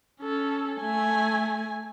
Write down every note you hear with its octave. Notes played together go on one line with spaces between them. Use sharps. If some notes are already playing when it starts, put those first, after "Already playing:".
C#4 A4
A3 G#5